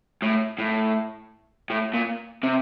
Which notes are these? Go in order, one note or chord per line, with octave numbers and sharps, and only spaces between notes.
A2
A2
A2
A#2
C3